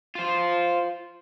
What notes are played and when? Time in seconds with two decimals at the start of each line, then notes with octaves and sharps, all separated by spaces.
0.15 F4 C5